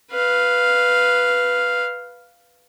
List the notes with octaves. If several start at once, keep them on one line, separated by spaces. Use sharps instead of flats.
B4 F5